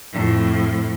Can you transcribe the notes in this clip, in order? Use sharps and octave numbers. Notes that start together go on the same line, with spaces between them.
F2 A2